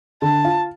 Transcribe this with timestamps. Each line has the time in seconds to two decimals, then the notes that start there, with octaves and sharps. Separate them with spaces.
0.22 D3 A5
0.45 F4